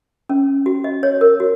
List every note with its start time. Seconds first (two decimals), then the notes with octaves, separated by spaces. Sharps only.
0.29 C#4
0.66 F#4
0.84 D#5
1.03 C#5
1.21 A#4
1.40 F#4